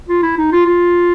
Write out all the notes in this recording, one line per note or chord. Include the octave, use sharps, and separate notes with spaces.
F4
E4
D#4
F4
F4